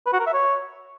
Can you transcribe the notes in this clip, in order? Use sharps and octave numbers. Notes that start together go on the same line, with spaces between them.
B4
F#4
A#4
E5
C#5